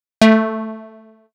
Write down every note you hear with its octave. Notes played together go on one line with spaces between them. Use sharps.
A3